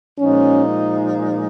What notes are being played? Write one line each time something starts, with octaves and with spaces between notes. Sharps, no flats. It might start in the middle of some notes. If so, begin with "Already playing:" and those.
A#2 F3 G#3 C#4 D#4